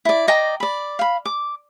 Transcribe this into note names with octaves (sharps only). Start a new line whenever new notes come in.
E4 D5
D5 D#5 G5 A#5
D5 B5
F5 B5
D6